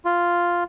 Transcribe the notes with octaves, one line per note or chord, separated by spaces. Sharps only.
F4